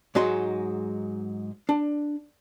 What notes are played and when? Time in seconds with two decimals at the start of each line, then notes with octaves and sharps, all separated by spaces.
0.15 G#2 F#3 G#3 D#4 F#4 C6
1.69 D4